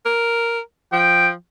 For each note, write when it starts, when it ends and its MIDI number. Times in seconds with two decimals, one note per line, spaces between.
0.06 0.60 70
0.93 1.34 53
0.93 1.27 79